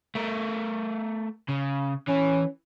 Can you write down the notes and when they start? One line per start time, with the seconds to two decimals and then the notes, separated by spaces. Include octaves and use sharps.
0.15 A3 A#4
1.49 C#3
2.08 E3 C#4